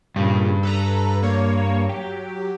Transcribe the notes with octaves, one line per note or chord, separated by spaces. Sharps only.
G2 A#2 C#3
A4 B4 A#5
A#3 C#5
F#3 G4